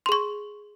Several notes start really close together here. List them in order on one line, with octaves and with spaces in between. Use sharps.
C6 G#4 C#6